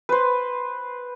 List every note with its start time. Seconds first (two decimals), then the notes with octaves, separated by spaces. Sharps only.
0.09 B4 C5